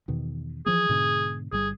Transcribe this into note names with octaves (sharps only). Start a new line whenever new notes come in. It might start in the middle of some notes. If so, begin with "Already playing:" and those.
E2 B2 D#3
E3 F3 A#3 G#4
G#2 B2 D3
G1 G3 G#4